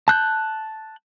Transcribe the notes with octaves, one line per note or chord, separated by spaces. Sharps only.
A5 F#6 G6